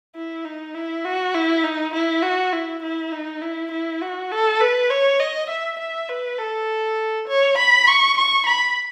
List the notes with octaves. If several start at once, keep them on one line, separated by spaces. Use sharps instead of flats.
E4
D#4
E4
F#4
E4
D#4
E4
F#4
E4
E4
D#4
E4
E4
F#4
A4
B4
C#5
D#5
E5
E5
B4
A4
C#5
B5
C#6
C#6
B5